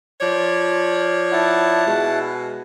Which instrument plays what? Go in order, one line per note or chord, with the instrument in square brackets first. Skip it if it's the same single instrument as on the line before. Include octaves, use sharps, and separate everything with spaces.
[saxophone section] F3 C#5 D5
[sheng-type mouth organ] E4 F#5 A5
[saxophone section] B2 G#3